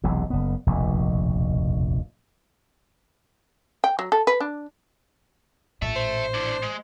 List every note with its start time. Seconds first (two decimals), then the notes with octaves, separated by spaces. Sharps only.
0.04 E1 B1 E2 C3
0.30 F#1 B3
0.67 F1 A#1 D#2 B2
3.84 G5
3.99 F#3
4.12 A4
4.27 B4
4.40 D4
5.82 A1 A#2 E5 A5
5.96 C5
6.34 D4 E4
6.62 G#3